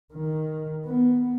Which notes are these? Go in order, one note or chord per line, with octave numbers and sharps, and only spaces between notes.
D#3
B3